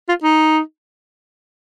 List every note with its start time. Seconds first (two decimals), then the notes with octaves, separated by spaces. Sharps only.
0.09 F4
0.23 D#4